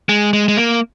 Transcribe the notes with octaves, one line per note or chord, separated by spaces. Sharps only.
G#3
G#3
G#3
A#3